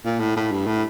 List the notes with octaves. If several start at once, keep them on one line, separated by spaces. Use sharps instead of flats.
A#2
A2
A2
G2
A2